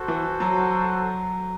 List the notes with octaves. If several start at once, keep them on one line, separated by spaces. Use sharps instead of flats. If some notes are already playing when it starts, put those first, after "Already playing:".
Already playing: F#4 A4 C5
E3
F#3